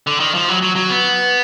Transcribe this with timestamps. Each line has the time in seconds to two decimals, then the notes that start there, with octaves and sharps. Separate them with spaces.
0.07 D3
0.20 D#3
0.34 F3
0.49 F#3
0.62 F#3
0.76 F#3
0.90 B3